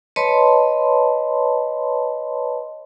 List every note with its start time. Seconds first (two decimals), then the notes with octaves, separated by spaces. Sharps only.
0.16 B4 C#5 D#5 A5 B5 C6